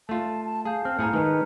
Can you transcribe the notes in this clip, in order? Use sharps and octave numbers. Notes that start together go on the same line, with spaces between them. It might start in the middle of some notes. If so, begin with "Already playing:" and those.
A3 F4 A5
A5
G#4 F5 A5 G6
C4 F6
A2 G#4 G#5 A#5 C#7
D#3 G#3 B4